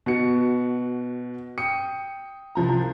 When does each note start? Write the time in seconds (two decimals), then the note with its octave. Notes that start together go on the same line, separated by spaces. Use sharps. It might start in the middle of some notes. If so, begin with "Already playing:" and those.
0.06 B2 F#4 C#7
1.58 G5 D#6 C#7
2.55 C2 F3 A#5